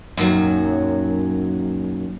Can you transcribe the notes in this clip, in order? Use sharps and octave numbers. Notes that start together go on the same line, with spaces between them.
F#2 A#2 D#3 F#3